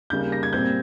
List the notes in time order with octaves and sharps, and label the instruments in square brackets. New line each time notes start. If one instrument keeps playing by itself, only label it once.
[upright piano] D#2 C#3 G3 A#3 G6
A#6
G#6
A#2 G3 C4 G6